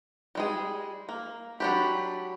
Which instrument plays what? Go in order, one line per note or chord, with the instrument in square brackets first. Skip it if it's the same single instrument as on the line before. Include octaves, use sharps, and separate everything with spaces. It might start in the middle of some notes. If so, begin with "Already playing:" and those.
[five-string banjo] G3 G#3 G#4
A#3
[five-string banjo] F#3 D4 G4 [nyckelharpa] B5